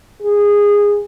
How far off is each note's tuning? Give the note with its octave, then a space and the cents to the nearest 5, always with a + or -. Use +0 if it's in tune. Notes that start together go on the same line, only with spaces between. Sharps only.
G#4 -15